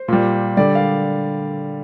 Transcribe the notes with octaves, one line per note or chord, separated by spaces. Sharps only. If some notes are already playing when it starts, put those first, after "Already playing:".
Already playing: C5
A#2 G3
D3 G3 D5
F5